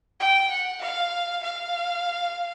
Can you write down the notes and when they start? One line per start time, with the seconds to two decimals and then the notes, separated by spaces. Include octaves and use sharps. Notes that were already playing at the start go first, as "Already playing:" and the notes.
0.20 G5
0.50 F#5
0.81 F5
1.43 F5